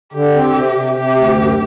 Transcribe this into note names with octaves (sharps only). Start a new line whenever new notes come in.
D3 G4
C4
C3
C3
C3 G4
D2
F#2